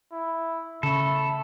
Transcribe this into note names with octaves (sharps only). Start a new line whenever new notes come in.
E4
C#3 A3 A4 B5